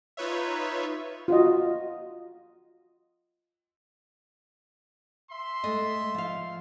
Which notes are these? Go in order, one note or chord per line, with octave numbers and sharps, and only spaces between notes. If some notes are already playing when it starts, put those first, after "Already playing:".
D#4 F4 B4 C#5 E5
F4 F#4 D#5
E5 C6
G#3 A3 D#5
F3 F5